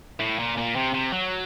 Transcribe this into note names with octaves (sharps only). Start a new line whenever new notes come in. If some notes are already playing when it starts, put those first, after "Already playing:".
A2
A#2
A#2
C3
C3
F#3